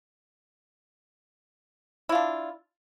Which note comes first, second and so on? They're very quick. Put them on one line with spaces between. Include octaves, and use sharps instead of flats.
E4 F4 D4